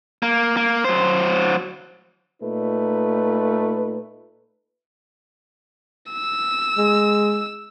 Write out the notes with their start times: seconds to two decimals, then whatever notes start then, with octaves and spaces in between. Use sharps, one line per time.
0.23 A#3
0.57 A#3
0.85 F#3 C5
2.43 A#2 A3 D#4 B4
6.12 E6
6.77 G#3